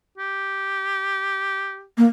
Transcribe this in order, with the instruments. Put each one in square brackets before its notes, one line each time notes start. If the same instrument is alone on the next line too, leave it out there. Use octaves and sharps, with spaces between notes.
[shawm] G4
[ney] A#3